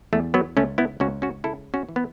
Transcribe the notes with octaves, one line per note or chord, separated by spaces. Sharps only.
E2 A3
F#3 B3
C#2 A3 C#4
B3 E4
C#2 C#4 F#4
C#4 F#4
C#3 E4 A4
C#4 F#4
E3
B3